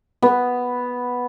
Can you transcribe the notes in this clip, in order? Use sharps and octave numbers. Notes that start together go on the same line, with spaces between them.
B3